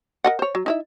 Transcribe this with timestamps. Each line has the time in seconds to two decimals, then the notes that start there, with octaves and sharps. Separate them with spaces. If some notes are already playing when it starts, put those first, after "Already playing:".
0.24 A#4 D#5 F#5
0.39 C5 C#5
0.55 F#3
0.66 D#4 E4 E5